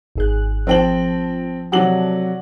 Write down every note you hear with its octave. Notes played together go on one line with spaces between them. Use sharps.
G#1 G#4 F#6
F3 C4 G5 A5 F#7
C3 F#3 A4 D5 F#5 F#7